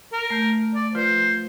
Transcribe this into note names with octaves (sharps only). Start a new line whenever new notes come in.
A#4
A3 G6
D5
F3 F4 B4 C5